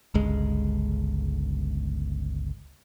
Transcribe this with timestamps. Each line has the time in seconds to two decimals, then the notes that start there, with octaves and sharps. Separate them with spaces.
0.14 G1 C#2 G#3